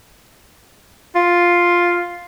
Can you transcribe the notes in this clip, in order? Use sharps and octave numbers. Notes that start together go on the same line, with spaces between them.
F4